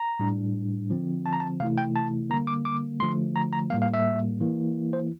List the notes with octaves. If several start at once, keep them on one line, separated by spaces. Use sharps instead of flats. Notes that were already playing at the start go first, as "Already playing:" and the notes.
Already playing: A#5
A2 G3 D4
D3 F3 C4
A5
A#5
A5
C3 E3 A3 E4 F5
G5
A5
D3 G3 A#3 A#5
D6
D6
D3 F3 A3 C6
A#5
A#5
A2 G3 A#3 F5
F5
E5
E3 A#3 E4
C5